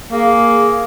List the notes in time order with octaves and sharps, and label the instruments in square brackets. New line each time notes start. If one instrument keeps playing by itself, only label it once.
[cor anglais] A#3 [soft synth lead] G#4